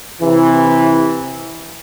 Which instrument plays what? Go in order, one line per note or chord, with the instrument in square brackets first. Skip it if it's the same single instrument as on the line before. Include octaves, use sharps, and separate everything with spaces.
[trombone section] C3 E3